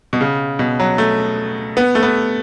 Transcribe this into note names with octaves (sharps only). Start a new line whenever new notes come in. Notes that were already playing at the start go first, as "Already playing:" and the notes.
B2
C#3
B2
F#3
A3
B3
A3
B3